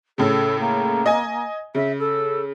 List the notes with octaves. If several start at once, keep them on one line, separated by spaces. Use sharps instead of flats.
A2 C#3 A4
A#3
D#5 G#5
C#3 E5
A4